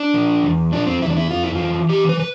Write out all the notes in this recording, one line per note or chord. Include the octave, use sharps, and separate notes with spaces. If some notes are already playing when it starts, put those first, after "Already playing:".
Already playing: D4
F3
E2
F3 D4
C4
E2 E4
D4
E4
F2 F4
E4
E3 F4
E3 G4
B4
B4